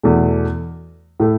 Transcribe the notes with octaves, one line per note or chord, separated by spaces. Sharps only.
E2 B2 A3
A2 A3